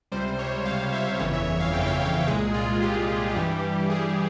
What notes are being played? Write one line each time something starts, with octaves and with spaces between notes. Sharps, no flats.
C#2 C3 G3 C5
C#5
C#2 C3 G3 F5
E5
G1 F2 C#3 E3 C#5
E5
E5
F5
G1 F2 C#3 E3 G5
F5
C#5
C2 A#2 G#3 G#4
F4
C2 A#2 G#3 G4
G2 E3 G3
G2 E3 G3 G#4